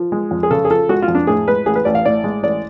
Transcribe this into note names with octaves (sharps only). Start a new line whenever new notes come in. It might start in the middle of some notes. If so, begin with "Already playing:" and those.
Already playing: F3
G#3
F2
G#4
C#3 A4
G#4
F3 A4
G#3 F#4
F4
F2
D4
A2 G#4
G#3 B4
A1 G#4
B4
A1 D5
F5
A2 D5
G#3
A1 D5